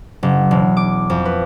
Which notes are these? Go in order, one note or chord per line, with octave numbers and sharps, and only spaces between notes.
F#1
E1
D6
F2
B4